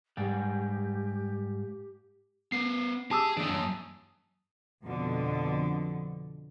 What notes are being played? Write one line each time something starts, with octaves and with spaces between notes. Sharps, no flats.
G#2 G3 G4
B3 A#4 B4 C7
G4 G#4 A5 D#6 E6
D#3 E3 A#3 D4
F#2
F2 B2 D3